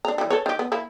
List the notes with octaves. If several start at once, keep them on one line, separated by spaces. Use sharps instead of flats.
D4 A#5
E3 G3
A4 B4 C#5
D#3 G4
B3
A#3 E4